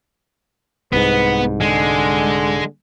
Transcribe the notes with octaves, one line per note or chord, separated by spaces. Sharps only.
C2 G#2 B3 B4
D3 G#3